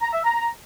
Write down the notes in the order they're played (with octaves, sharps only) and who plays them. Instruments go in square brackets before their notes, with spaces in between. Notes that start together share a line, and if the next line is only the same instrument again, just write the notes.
[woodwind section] A#5
E5
A#5